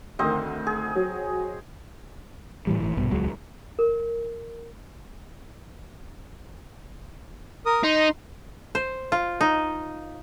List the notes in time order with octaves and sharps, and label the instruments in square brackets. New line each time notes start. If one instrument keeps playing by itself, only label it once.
[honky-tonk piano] D2 D#3 [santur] C4 C5 D#5
[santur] G#4
[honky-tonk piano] F#3
[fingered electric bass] A2 E3 G3
G#1 A2 E3
A#1 G2 B2
D#1 C#2 F#3 G#3
[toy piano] A#4
[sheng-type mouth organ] A#4 D#6
[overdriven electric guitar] D#4 [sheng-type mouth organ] C6
[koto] C5
F4
D#4